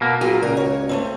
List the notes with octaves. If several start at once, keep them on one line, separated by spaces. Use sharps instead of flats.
B2 A#3
A#2 F#3 F4 G#4
C#2 A#2 A#4 A#5
C#5
A3 A#3 C4